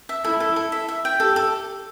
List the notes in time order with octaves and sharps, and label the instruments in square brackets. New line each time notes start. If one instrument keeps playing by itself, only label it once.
[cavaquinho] E5
[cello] E4 [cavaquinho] A4
[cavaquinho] A4
A4
E5
E5
G5
[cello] G4 [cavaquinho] A4
[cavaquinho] A4